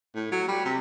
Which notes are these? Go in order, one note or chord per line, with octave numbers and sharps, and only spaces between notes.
A2
F#3
G3
C3